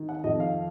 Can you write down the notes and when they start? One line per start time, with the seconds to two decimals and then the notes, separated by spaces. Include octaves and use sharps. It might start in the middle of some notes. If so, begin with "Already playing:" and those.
Already playing: D#3
0.09 F#5
0.24 F2 D#5
0.40 F5